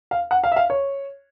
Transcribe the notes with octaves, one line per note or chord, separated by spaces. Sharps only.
F5
F#5
F5
E5
F5
C#5